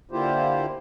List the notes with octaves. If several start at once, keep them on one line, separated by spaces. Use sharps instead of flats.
D3 A#3 E4 F4 G4 C5